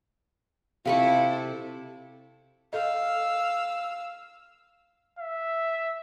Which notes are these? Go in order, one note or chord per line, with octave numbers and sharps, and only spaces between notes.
C3 E4 F4 A4 B5 C#6
A4 D#5 F5 E6
E5